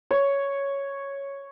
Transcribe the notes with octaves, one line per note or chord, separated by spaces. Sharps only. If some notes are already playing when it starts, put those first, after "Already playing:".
C#5